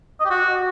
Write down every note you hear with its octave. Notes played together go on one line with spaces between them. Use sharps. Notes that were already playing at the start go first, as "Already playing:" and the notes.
D#5
G4
F#4